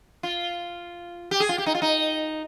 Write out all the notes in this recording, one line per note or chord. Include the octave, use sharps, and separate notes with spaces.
F4
G4
G#4
F4
G4
D#4
F4
D#4